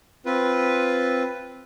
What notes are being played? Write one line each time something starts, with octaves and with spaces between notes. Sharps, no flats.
C4 F4 B4